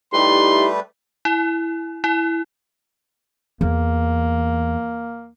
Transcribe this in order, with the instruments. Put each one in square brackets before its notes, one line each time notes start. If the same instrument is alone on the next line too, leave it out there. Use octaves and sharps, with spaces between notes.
[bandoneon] G3 A3 B4 [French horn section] D#4 E4 G4 [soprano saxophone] C6
[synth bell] E4
E4
[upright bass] E2 [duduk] A#3